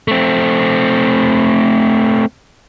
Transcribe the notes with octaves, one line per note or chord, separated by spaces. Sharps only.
A3 C4